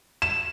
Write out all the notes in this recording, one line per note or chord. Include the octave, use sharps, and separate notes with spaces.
E7